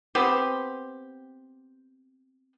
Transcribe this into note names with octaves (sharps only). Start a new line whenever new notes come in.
B3 C4 G4